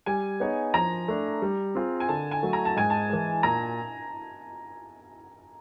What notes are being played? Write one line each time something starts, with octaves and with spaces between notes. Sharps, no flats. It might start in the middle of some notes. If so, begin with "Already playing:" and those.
G3 G#5
B3 D#4 G#4 C#5
F3 A#5
A3 D4
G3
C4 F4 G#4
G#5
D3 A5
G#5
F#3 A3
A#5
A5
G#2 G#5
A5
E3 G#3
A#2 A#5